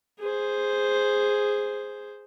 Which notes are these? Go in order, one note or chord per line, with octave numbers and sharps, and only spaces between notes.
G#4 C5